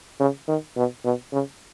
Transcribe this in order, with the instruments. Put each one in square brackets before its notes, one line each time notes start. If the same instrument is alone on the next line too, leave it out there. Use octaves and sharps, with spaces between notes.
[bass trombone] C#3
D#3
B2
B2
C#3